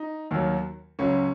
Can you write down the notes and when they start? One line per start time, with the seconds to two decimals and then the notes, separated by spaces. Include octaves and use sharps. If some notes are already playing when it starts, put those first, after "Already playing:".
Already playing: D#4
0.31 D#2 D#3 F#3
0.99 C#2 C#3 F#3 C#4